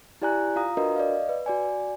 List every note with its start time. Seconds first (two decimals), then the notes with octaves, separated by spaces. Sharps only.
0.22 E4 G4 D5 G#5 A#5 F#6
0.56 F4 F5 A#5 D#6
0.77 D4 F#4 A#4 B4 D#5
0.96 D5 D#5 F5
1.29 B4
1.46 F#4 D5 G#5